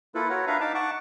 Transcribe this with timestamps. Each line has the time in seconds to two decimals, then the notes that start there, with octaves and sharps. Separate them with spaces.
0.15 A#3 E4 F4 A4 B4
0.30 F4 F#4 A#4 B4 C#5 F#5
0.47 D4 B4 E5 F5 A#5
0.60 D#4 F5 A5 D6
0.75 F#5 A5 C#6 D6